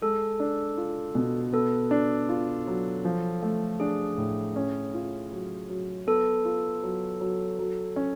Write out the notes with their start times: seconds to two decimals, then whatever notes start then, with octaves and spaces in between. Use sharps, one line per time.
0.02 G#3 A4
0.40 D4
0.77 F4
1.15 B2
1.53 B3 A4
1.91 D4
2.29 F4
2.67 F#3
3.05 F3
3.43 A3
3.80 D4 G#4
4.18 A2
4.56 C#4
4.94 F4
5.32 F#3
5.69 F#3
6.07 B3 A4
6.45 F4
6.83 F#3
7.21 F#3
7.59 F#3
7.96 C#4